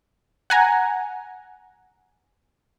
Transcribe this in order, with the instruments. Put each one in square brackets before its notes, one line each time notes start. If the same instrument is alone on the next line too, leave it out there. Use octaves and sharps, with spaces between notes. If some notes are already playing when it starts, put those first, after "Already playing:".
[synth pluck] F#5 G#5 A#5